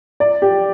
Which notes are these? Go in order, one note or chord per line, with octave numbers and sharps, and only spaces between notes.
D5
G4